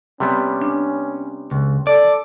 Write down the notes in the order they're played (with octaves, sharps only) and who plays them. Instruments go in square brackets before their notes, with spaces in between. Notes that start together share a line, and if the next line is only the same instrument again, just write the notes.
[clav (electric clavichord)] C3 G3 B3 [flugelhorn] C#4
[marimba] D4
[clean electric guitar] C#2
[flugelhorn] A4 [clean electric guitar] D5